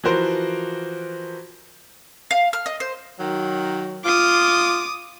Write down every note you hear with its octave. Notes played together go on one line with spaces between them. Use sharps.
E3 F3 F#4 A#4 C5
F5
F6
D#5
C5
D#3 F#3
F4 D6 D#6